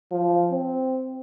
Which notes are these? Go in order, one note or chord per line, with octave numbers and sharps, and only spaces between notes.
F3
C4